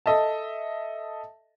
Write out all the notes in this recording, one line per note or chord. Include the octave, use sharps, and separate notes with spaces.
A4 D#5 E5 A5